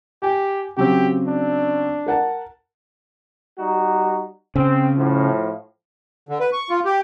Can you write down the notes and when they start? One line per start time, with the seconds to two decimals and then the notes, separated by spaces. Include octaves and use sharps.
0.22 G4 G5 G#5
0.77 C#3 F#3 C4 G4
1.28 D4
2.06 A#4 F#5 A5
3.59 G3 D#4 F#4
4.56 C#3 C4
4.96 A2 F3
6.29 D3
6.40 B4
6.53 C#6
6.70 F4
6.85 G4